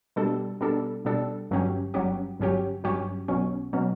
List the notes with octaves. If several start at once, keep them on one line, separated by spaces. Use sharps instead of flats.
B2 G3 D4 A4
B2 G3 D4 A4
B2 G3 D4 A4
G1 G2 F#3 C#4 G4
G1 G2 F#3 C#4 G4
G1 G2 F#3 C#4 G4
G1 G2 F#3 C#4 G4
B1 B2 F#3 C#4
B2 F#3 C#4